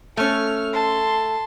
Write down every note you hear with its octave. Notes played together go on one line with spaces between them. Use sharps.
A3 C#4 A4 F6
A5 C6